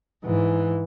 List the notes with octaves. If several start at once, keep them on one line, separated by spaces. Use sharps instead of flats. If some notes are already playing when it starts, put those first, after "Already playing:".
G#2 E3